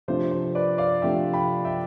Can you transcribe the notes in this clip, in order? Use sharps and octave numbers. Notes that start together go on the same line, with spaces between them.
C3 F3 A3 D4 C5
C5
B4 D5
D5 F5
C3 F3 A3 D4 E5 G5
G5 B5
E5 G5